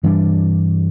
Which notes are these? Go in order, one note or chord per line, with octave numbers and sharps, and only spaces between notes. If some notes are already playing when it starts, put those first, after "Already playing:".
G2 E3 G3 D4